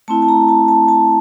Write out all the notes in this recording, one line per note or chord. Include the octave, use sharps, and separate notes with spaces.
A3 C4 E4 A5
A5
A#5
A5
A5
A5